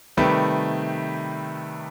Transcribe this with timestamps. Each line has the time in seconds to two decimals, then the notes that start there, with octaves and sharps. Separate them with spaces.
0.17 C3 D#3 G3 A3 B4